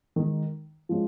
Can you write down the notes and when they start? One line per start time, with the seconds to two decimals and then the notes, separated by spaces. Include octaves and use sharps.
0.16 D#3 G#3 D#4
0.89 F3 G#3 C#4